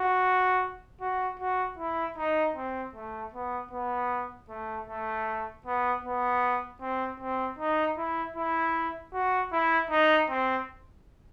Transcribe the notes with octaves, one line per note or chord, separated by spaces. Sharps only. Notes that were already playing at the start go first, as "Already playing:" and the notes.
Already playing: F#4
F#4
F#4
E4
D#4
C4
A3
B3
B3
A3
A3
B3
B3
C4
C4
D#4
E4
E4
F#4
E4
D#4
C4